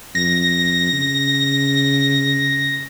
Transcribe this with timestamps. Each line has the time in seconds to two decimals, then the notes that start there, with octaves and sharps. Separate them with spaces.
0.15 F2 A#6
0.92 C#3